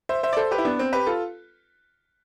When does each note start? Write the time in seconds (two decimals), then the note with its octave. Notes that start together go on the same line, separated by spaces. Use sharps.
0.09 C5 E5
0.23 C5 E5
0.33 D5
0.37 A4 C5
0.51 G4 B4
0.58 E4
0.65 B3 D4
0.79 C4
0.93 G4 B4
1.07 F4 A4